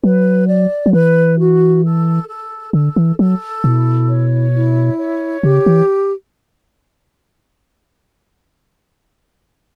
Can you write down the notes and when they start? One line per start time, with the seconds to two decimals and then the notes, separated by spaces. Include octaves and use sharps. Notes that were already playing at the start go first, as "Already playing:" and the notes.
0.03 F#3 B4
0.48 D5
0.86 F#3
0.93 E3 B4
1.39 F#4
1.83 A4
2.29 A4
2.73 D3 A4
2.96 E3
3.19 F#3 A4
3.63 B2 E4
4.09 C#5
4.53 E4
4.99 C#5
5.43 C#3 G4
5.66 E3